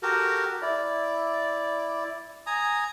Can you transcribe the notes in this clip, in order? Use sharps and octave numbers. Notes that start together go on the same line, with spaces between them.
F#4 G4 A4 A#4
E4 D5
G#5 A#5 D#6